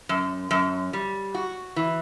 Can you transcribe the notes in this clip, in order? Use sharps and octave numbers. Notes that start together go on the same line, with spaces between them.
F#2
F#2
G3
F#4
E3